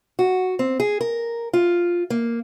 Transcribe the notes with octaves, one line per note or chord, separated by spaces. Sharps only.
F#4
C4
G#4
A#4
F4
A#3